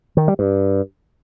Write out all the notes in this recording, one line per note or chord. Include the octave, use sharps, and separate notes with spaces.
D#3
G3
G2